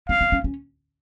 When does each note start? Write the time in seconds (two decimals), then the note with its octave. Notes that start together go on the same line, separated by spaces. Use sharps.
0.09 C4 F5
0.21 C4
0.32 C#4
0.44 C#4